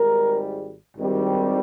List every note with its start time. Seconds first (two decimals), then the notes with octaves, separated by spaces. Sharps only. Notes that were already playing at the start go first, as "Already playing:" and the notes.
Already playing: G#1 G#2 G3 A#4
0.97 G#1 G2 D#3 G3 C4